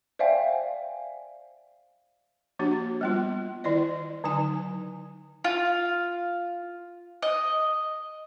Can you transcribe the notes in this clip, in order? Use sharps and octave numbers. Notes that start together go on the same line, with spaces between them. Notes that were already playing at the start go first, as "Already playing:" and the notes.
C5 D5 E5 F5 G5 G#5
F3 A#3 D4 F#4 G4
G3 B3 F4
D#3 E4 D5 D#5
D3 F#3 D#4 G#5
F4
D#5